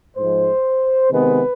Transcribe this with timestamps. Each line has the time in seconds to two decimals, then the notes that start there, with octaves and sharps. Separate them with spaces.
0.17 G#2 F3 G#3 C5
1.10 C3 D#3 G#3 B3 B4